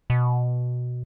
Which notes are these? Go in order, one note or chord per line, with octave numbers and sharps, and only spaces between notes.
B2